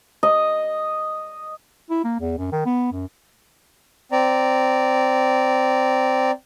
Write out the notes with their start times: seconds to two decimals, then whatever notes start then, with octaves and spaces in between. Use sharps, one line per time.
0.23 D#5
1.90 E4
2.04 A#3
2.20 E2
2.38 F#2
2.52 D#3
2.66 B3
2.92 F#2
4.12 C4 D5 A#5